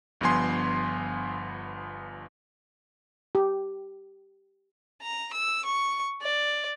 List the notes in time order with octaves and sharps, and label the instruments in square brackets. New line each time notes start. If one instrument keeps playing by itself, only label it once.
[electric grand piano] G1 G2 F3 B3 G#5 C6
[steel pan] G4
[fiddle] A#5
E6
C#6
D5